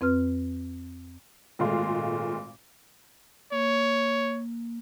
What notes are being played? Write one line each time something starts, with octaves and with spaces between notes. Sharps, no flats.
F2 C4 B4 F6
G#1 A#2 G#3 A3 F5 C6
A#3 C#5